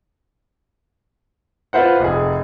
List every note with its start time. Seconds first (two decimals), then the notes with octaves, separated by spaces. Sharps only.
1.73 F4 B4 C5 F#5
2.00 F1 G#4